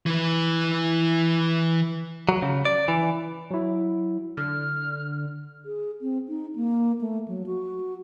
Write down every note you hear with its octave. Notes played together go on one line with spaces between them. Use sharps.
E3 B4
F#3
C#3
D5
E3
F#3 E4
D3 F6
G#4
C4
D#4
A#3
A3
F#3
F#4